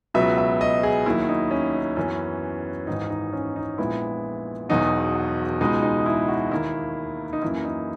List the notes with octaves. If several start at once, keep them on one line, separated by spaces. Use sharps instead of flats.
C#2 B2 F#3 B3 E5
E5
D#5
G#4
D#2 D#3 F#3 E4
D#4
C#4
D#4
F#2 E3 B3 C#4
G#1 G#2 E3 D#4
D#4
C#4
D#4
A#1 A#2 G#3 B3 E4
E1 E2 B2 F#3 D#4
C#2 B2 G#3 D#4
D#4
E4
F#4
D#2 D#3 A#3 E4
D#4
F#2 E3 A#3 E4
D#4